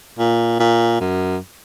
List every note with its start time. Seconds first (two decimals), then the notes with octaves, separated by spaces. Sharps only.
0.19 A#2
0.60 A#2
1.01 F#2